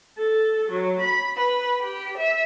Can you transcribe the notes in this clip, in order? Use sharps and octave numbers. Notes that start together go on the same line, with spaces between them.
A4
F#3
B5
B4
G4
E5